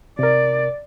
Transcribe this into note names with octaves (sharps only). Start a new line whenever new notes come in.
C3 A#4 D5